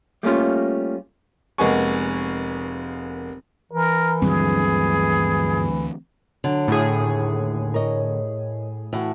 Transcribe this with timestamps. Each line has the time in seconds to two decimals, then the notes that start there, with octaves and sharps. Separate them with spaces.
0.23 G3 A3 A#3 C#4 F4
1.58 F1 G#3 A#3 B3 G#5 C#6
3.72 E3 A#4
4.22 D2 G2 D3 F3 F#3 C4 G#4
6.44 D3 F#3
6.68 A2 G#4
7.00 D#2
7.74 A#4 C#5 D#5
8.93 A2 E3 F#4